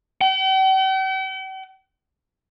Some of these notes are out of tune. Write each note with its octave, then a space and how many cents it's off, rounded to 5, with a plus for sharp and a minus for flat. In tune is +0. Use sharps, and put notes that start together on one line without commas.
G5 -45